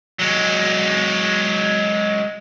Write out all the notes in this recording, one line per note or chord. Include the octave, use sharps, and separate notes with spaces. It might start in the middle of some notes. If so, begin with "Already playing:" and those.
F#3 G#3